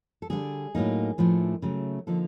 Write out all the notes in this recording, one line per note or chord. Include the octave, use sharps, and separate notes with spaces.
A4
D3 G3 B3 D4 G#4
A2 F#3 A#3 D#4
A2 F3 A3 D4
C#3 F#3 A3
D3 F3 A#3 D#4 A4